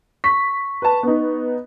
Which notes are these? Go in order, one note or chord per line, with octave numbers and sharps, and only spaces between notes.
C#6 B6
B4 A5
B3 D#4